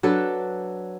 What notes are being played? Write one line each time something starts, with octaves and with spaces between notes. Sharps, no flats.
F#3 D4 A4 B4